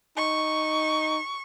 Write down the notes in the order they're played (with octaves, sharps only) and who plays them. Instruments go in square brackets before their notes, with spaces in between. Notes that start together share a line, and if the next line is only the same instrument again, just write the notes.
[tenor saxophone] D#4 [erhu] C#6